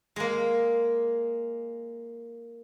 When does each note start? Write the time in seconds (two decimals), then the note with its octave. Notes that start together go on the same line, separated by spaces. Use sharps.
0.16 G#3 A#3